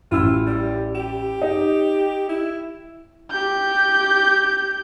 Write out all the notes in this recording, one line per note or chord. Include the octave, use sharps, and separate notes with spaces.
A1 E4 F4 E6
G3
G4
D#4
E4
G4 G6